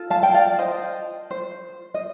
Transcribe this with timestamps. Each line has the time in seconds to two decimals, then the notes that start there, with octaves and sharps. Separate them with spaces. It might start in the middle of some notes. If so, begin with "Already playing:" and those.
Already playing: F4 A4
0.10 F5 A5
0.23 G5
0.34 D5 F5
0.59 C5 D#5
1.31 C5
1.94 D#5